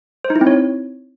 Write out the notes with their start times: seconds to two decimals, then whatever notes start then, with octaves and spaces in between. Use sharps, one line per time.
0.25 C5
0.30 D#4
0.36 E4
0.41 C4
0.47 C#5